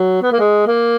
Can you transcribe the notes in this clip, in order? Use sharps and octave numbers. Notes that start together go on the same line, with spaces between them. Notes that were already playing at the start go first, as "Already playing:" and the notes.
Already playing: F#3
B3
A#3
G#3
A#3